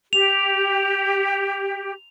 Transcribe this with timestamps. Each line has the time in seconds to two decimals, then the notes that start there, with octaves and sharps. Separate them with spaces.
0.13 G4 F7